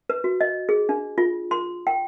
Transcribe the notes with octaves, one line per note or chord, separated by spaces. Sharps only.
B4
F#4
D#5
G#4
D4
F4
C6
G5